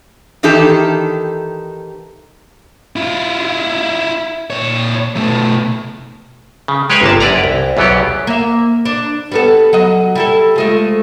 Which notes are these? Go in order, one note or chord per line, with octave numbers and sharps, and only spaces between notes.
D#3 E3 D#4 G4 A4
E4 F4
A#2 C#5
B2 A3
C#3
G#3 G4 B4 C#5 F5 G#5
G1 C3 A#3 A5
F#2 E4 B4 D5 A#5
C2
B1 E2 E3 F#3 B3 G4
A#3 E5
D4
G3 B3 A4
F#3 D#5
G3 E4 A4
F3 G#3 A3